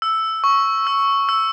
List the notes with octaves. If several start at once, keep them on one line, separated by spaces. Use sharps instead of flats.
E6
C#6
E6
E6